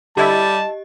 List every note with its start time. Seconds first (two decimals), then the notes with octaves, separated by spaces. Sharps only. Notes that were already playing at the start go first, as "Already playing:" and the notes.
0.17 D3 G3 E4 G4 D#5 A5